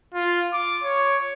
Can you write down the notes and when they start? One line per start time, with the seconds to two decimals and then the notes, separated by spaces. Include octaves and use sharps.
0.14 F4
0.53 D6
0.84 C#5